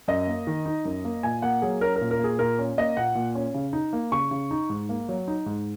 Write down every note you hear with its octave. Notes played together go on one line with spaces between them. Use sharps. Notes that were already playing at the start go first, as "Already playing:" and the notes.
F#2 D#5
A#3
D#3
D#4
F#2
A#3
A#2 G#5
A#3 F#5
F#3 G#4
C#4 A#4
A#4
A#2
A#4
A#3 G#4
A#2 A#4
C#4
A#3 D#5
A#2 F#5
A#2
C#4
C#3
D#4
A#3
C#3 C#6
C#3
D#4
G#2
A#3
F#3
D#4
G#2